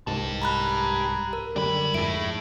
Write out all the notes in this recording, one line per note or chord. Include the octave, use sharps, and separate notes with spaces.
C2 G#2 G4 A5
A#5 B5 F#6
A#4
F#2 D3 G3 D4 B5
F2 G#2 E4 A4 D7